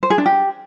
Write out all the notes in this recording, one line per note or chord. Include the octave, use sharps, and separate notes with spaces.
C5
G#4
D4
G4